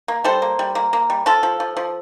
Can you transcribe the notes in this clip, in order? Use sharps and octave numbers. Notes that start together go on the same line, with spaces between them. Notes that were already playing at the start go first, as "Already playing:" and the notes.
A#3
G3 A4 C5
A#3
G3
A#3
A#3
G3
F3 F4 A4
F3
F3
F3